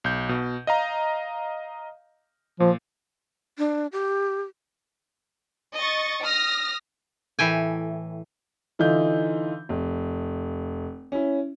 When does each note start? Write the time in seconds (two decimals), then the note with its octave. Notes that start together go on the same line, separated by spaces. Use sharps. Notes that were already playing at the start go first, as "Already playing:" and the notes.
0.04 B1 G6
0.29 B2
0.67 D#5 F5 A#5
2.60 A#2 F3
3.58 D4
3.92 G4
5.77 D#5 C#6 A6
6.24 D#6 F6 A#6
7.39 A2 E3 G5 G#5
8.79 D3 E3 D#4 F4 G6
9.69 F1
11.12 C#4 E4